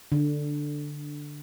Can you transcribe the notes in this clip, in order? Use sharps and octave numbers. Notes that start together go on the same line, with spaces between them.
D3